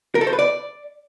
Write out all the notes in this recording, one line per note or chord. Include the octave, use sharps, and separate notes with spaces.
A#4
A4
C5
B4
D5